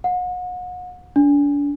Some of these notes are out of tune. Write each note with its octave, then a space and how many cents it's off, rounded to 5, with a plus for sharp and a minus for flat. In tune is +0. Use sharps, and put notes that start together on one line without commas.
F#5 -35
D4 -35